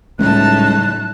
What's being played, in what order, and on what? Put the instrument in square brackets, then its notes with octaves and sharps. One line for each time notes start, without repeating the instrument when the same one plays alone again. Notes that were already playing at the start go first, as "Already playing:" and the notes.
[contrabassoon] C#2 [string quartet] A2 D#4 A5 [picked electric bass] F#3 G3 A3 [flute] F#6